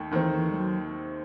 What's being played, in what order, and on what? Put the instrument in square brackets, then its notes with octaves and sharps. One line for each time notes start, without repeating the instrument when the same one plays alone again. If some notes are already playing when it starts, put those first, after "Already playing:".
Already playing: [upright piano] D#2 D#3 A3
[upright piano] D#2 D#3 A3 C4 [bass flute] E3
[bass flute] E3
G3
F#3